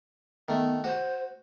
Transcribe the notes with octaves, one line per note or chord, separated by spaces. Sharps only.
D#3 A3 B3
F#4 C5